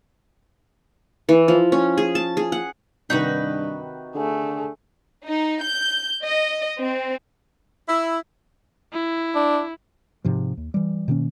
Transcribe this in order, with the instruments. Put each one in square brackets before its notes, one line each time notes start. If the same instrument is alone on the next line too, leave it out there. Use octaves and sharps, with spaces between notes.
[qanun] E3
F3
C#4
G#4
A5
G#4
F#5
[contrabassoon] G2 [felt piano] C3 D#3 [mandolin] D#4 F#4 B4
[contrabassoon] D3 [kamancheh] A3 G#4
[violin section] D#4
G6
D#5
C4
[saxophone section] E4
[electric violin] E4
[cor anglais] D4
[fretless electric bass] G#2 C3 F3
D#2
E3 G3
B2 D#3 A#3 C#4